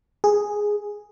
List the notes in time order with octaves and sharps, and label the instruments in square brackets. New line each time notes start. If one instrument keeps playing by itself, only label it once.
[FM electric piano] G#4